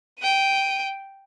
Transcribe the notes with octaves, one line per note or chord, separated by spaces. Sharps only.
G5 D#7